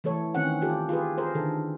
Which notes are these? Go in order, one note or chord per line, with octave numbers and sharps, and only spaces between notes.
E3 A3 A4 C#5
D#3 C4 C#4 F#5
F4 G4 A4
F4 G4 G#4 B4
F4 G#4 A#4 C5
D3 D#3 A4